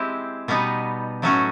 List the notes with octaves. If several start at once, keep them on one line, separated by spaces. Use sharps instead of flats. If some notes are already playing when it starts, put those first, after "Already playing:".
Already playing: G#3 C4 E4 G4
B2 G3 B3 D#4
A2 F#3 A3 C#4 F#4